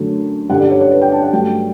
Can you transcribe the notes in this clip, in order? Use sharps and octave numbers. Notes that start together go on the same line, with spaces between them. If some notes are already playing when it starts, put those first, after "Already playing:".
Already playing: F#2 D3 F#3 A3
G2 D3 G3 F#5
D5
C#5
C#5
B4
G5
A5
F#5
G2 F#3 A3 G5